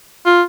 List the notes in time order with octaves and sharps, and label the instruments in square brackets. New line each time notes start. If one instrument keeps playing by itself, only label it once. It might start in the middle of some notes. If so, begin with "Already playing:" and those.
[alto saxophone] F4